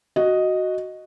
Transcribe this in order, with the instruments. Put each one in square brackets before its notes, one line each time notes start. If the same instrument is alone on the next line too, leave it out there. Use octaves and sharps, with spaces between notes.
[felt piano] F#4 D#5